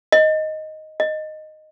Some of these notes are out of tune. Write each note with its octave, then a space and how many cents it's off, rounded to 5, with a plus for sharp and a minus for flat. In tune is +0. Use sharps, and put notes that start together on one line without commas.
D#5 +5
D#5 -5